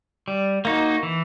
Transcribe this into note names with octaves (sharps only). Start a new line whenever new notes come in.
G3
A#3 D#4 F#4
E3